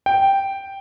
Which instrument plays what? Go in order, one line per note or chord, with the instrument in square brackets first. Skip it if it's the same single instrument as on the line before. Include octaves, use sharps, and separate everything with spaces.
[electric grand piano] G5